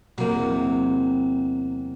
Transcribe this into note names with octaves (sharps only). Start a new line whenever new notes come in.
E2 C3 F#3 A#3